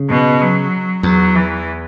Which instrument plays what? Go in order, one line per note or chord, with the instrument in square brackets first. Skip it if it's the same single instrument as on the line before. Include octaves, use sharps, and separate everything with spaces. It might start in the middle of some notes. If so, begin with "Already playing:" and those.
Already playing: [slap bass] C#3
[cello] B2
F#3
[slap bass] E2 [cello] F#3
[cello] E3